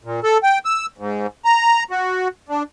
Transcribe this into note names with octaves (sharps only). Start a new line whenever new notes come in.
A#2
A4
G5
E6
G#2
A#5
F#4
D4